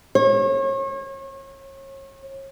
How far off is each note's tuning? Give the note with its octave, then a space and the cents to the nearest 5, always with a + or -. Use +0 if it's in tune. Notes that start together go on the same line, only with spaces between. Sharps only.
C#5 -35